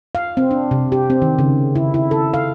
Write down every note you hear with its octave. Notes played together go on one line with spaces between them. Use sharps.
F5
C4
D4
C3
G4
C4
D#3
C#3
E4
E4
A4
F5